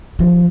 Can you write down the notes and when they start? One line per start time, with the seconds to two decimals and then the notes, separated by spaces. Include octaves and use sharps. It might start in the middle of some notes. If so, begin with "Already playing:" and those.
0.19 F3